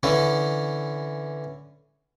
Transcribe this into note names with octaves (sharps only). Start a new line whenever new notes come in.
D3 E3 C#4